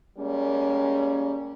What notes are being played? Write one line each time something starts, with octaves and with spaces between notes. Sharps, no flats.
G3 G#3 A#3 C#4